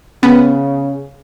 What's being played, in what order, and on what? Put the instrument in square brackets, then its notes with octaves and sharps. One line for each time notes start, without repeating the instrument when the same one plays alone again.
[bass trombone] C#3 [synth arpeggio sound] B3 [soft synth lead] C#4